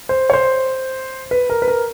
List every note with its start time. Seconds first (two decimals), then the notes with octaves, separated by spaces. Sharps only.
0.09 C5
0.30 C#5
0.33 C5
1.31 B4
1.50 A#4
1.62 B4
1.68 A#4